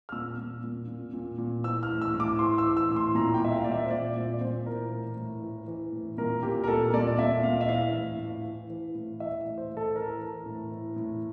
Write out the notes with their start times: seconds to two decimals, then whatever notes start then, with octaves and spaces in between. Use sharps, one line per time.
0.09 F6
0.12 A#2 E6
0.38 A#2
0.63 A#2
0.88 A#2
1.13 A#2
1.38 A#2
1.64 E3 E6
1.83 F6
1.88 A2
2.02 E6
2.14 A2
2.20 D6
2.39 E3 C6
2.58 E6
2.65 E3
2.77 E6
2.90 A2
2.96 C6
3.15 A#2 A#5
3.34 G5
3.40 A#2 E5
3.52 F5
3.64 A#2 D5
3.72 E5
3.86 C5
3.91 A#2 D5
4.16 A#2
4.33 D5
4.41 A#2 C5
4.66 E3 A#4
4.91 A2
5.17 A2
5.42 E3
5.68 E3
5.93 A2
6.18 A#2 A#4
6.43 A#2 G4
6.64 A#4
6.68 A#2 A4
6.94 A#2 D5
7.07 D5
7.19 A#2 E5
7.43 A#2 F5
7.61 E5
7.68 E3 F5
7.93 A2
8.19 A2
8.44 E3
8.70 E3
8.95 A2
9.20 E3 E5
9.45 A2
9.58 C5
9.71 A2
9.77 A4
9.95 E3 A#4
10.22 E3
10.46 A2
10.72 E3
10.96 A2